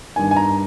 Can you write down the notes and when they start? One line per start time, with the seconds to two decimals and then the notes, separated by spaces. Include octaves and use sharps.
0.16 G2 D#3 G#5
0.31 G#5
0.36 A#5